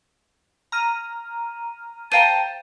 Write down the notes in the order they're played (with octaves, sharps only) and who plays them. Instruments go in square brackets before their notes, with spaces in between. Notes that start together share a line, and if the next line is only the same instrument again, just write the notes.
[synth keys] A#5 F6 D#7
[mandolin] C5 G5 A#5 [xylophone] F5 D#7 [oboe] A5